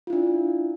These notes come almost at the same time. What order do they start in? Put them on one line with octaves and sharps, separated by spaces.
F4 E4 D4